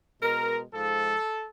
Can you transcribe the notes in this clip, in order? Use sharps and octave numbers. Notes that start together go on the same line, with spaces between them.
B2 G#3 A#4
G#2 F3 G#3 A4